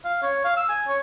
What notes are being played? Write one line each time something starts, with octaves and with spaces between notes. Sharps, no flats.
F5
C#5
F5
E6
G#5
C#5